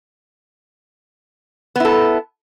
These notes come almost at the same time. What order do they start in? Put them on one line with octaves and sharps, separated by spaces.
B3 E4 A4